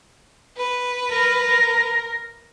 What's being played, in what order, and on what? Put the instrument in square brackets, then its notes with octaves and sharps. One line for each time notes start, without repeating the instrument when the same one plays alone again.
[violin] B4
[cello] A#4